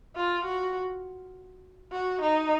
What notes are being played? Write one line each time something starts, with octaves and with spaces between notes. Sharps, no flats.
F4
F#4
F#4
D#4